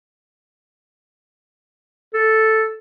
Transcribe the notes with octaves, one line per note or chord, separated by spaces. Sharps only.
A4